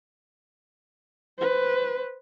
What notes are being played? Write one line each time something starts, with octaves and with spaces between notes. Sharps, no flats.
B4 C5